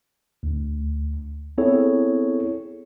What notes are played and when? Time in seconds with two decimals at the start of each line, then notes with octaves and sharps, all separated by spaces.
0.43 D2
1.58 B3 C4 E4 G#4 A4 C#5